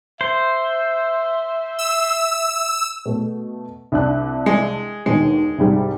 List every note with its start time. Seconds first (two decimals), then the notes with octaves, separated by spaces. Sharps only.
0.21 C5 E5
1.79 E6
3.06 B2 A3
3.92 C2 D4 F#6
4.46 G#3
5.06 D#2 B2 D3 G#3
5.58 C2 G#2 G3